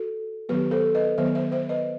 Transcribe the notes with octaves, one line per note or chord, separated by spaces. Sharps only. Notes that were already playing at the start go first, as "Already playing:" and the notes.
Already playing: F#4 A4
D#3 F#3 B3 G4 B4
A4 C5
B4 D#5
D#3 F#3 B3 C5 E5
C5 E5
C5 E5
B4 D#5